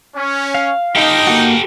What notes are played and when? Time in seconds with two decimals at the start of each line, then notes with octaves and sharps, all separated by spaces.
0.16 C#4
0.55 F5
0.96 D#4 G4 A4
1.27 A#3 F#4